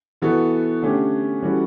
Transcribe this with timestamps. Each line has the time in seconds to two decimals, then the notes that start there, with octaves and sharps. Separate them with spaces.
0.22 E3 B3 F#4 A4
0.82 D3 A3 C#4 G4
1.42 E3 G3 C#4 F#4 A4